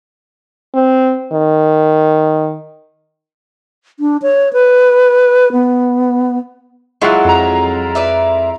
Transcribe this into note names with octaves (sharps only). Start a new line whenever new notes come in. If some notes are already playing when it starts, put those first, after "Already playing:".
C4
D#3
D4
C#5
B4
B3
F#3 G#3 E4 F4 F#5
F2 A#5
B4 D5 E5